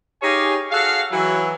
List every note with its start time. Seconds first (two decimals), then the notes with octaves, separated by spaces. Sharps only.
0.22 D#4 G4 G#4 C#5 F5 G#5
0.71 F#4 G#4 A4 F5
1.11 E3 F#3